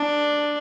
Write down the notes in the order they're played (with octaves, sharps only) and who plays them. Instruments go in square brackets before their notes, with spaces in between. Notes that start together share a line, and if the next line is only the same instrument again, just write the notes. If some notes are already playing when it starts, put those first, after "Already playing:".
Already playing: [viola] D4